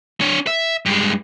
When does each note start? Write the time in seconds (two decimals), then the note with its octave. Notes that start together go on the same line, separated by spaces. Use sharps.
0.21 D4 C#5
0.47 E5
0.85 G2 G#3